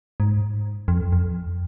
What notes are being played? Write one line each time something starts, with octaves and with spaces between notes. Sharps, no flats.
G#2
F2
F2